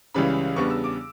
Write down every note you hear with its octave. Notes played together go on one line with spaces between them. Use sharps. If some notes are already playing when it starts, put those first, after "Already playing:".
C#2 C#3 E3 G3 C#4 B5
E2 C#3 G3 B3 D4 C#6
E6
D6